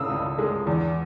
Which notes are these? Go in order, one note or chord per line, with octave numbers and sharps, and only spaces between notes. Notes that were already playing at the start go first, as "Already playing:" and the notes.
Already playing: C#3 D#6 E6
C#2
G#3
E2